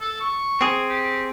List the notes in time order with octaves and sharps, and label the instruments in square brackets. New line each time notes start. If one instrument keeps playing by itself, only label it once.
[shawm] A4
C#6
[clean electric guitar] C4 G#4
[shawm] G4